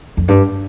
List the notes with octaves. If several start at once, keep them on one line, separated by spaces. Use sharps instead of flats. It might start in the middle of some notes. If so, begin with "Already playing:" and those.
F2
G2